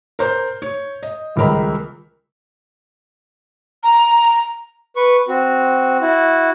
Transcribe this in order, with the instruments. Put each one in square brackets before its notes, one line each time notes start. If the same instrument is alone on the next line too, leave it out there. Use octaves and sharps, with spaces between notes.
[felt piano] A#4 C5 G6
C#5
D#5
D#1 C#2 G#3 A#4 B5
[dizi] A#5
[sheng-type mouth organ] B4 C#6
C4 F#4
E4 F#4